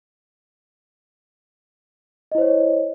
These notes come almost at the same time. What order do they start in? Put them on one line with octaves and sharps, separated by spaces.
D#5 E4 C5 C#5